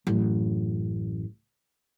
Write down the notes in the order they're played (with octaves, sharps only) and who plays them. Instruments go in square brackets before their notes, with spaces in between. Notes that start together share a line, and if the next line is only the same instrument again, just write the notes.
[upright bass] A1 F#2